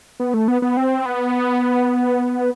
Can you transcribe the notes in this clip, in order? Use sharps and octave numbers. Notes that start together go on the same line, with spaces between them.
B3
A3
B3
B3
C4
B3